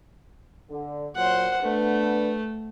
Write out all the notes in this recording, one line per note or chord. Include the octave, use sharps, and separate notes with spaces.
D3
A#2 F#3 C5 F#5
A3 B3 D4 B4